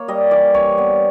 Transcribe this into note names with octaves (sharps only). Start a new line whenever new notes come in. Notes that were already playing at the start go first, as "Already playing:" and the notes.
Already playing: A#3 C#5
G3 D#5
E3 D5
D4 C#5
B3